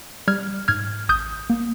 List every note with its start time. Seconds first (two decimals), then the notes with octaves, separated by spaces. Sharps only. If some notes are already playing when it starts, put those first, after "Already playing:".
0.28 G3 F6 G#6
0.68 G#2 F6 G#6
1.09 G#1 D#6 G6
1.50 A#3